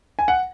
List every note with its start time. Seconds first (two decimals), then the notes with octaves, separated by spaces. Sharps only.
0.19 G#5
0.28 F#5